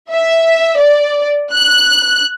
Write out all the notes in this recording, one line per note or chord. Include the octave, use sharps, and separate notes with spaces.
E5
D5
F#6